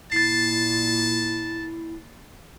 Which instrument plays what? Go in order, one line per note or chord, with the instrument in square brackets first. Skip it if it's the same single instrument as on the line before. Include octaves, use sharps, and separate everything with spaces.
[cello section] A#2 [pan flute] E4 [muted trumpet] A5 [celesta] A6 C7